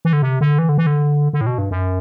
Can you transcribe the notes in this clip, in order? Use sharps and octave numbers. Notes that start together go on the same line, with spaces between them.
E3
D3
C3
D3
E3
D3
E3
D3
D3
A2
B2
G2
F#2